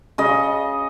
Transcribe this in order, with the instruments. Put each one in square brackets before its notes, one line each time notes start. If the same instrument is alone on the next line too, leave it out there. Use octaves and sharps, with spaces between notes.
[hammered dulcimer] C#3 D#5